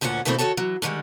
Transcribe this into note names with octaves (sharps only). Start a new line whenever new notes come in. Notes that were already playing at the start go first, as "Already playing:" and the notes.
D2 A#2 F3 C#4 F#4 F#5
B2 D#3 A3 A#3 C4 E4
D#3 F#4 A4 C#5 A5
E3 F#3
A2 D3 D#3 G3 G#3